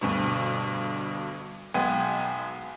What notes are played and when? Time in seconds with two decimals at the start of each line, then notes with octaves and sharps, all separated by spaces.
0.01 D2 G2 B2
1.74 B1 G#3 B3 G5 G#5